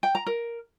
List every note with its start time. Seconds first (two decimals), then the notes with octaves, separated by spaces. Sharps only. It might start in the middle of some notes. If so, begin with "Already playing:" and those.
0.03 G5
0.15 A#5
0.26 A#4